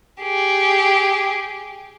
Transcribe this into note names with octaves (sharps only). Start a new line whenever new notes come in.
G4 G#4